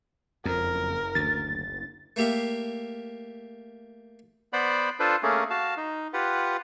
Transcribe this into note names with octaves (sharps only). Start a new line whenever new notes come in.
F#1 F2 A#4
D2 A6
A3 A#3 G4 E5 F5
B3 C5 D5 F#5 B5
D4 F4 A4 B4 C5
A3 A#3 C#4 G#4
F#4 F5 A5
D#4
F4 G4 B4 F#5